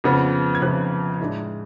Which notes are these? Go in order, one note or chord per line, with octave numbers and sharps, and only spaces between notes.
F2 C#3 F3 B3
G#6
F2 C#3 F3 B3 F#6
A2 G#3 D4